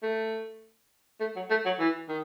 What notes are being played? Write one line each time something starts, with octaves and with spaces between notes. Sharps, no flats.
A3
A3
F#3
A3
F#3
E3
D#3